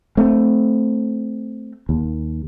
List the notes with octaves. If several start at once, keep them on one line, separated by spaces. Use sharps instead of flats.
A3 C4
D#2